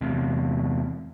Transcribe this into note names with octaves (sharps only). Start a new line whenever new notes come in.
E2 C3